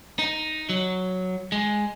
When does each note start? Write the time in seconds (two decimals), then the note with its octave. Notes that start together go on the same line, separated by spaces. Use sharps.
0.19 D#4
0.69 F#3
1.52 G#3